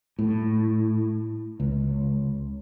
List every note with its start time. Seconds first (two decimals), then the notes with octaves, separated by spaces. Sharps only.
0.19 A2
1.60 C#2